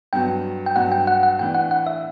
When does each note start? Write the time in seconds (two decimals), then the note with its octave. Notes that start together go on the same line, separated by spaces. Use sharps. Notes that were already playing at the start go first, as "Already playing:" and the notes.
0.13 G2 F#3 B3 F#4 G5
0.66 G5
0.76 G2 F#3 B3 F#4 F#5
0.92 G5
1.07 F#5
1.23 F#5
1.39 A2 E3 B3 D4 G5
1.54 F#5
1.71 F#5
1.87 E5